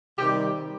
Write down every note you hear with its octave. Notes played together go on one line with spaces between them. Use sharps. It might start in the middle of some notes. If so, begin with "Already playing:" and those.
C3 D#3 G3 G4